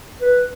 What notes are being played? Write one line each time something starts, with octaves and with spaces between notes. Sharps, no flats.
B4